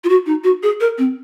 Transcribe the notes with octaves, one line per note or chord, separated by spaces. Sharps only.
F4
F#4
D#4
F#4
G#4
A#4
C4